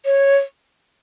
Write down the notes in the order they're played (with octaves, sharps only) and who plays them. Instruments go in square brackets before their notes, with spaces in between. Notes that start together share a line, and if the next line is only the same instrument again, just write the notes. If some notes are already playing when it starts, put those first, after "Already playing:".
[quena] C#5